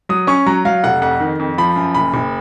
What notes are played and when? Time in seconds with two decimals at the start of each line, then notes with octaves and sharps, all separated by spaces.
0.09 F#3 D#6
0.27 C#4 C#6
0.46 F#3 A#5
0.65 F#3 F5
0.84 F1 F#5
1.02 F2 F#5
1.20 D#3
1.39 F2
1.58 F3 B5
1.76 F#2
1.95 F#1 B5
2.14 F#1